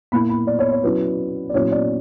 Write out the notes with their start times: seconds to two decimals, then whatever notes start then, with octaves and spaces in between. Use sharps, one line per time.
0.12 A#2 A#3 E4 B5
0.29 B5
0.47 D5
0.59 C#5
0.72 C#5
0.83 F#3 C#4 E4 B4
1.49 D5
1.54 A#2 F#3 C#4 E4 C#5
1.72 D5